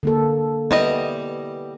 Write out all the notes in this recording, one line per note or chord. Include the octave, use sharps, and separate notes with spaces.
D3 A#3 A4
E3 G3 B3 D#5